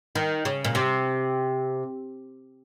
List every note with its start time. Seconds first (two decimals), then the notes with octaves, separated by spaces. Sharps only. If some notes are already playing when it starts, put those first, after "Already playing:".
0.15 D#3
0.45 C#3
0.64 A#2
0.75 C3